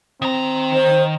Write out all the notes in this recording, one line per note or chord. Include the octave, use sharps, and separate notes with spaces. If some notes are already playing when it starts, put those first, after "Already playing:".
D#3 C4 A#5
C5